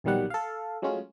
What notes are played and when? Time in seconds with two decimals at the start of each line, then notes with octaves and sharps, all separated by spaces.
0.04 A#1 B2 D#3 F#3 G3 F#5
0.30 A4 F5
0.82 F#3 G#3 A3 C#4 F4